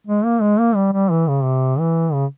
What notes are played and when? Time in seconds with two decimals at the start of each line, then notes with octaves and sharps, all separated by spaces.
0.07 G#3
0.25 A#3
0.42 G#3
0.60 A#3
0.76 G3
0.93 G3
1.11 E3
1.28 C#3
1.44 C3
1.79 E3
2.13 C#3